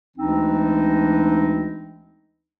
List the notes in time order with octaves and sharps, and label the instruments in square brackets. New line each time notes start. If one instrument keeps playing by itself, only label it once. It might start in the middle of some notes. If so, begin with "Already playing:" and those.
[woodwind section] D2 E3 G#3 C4 D4 D#4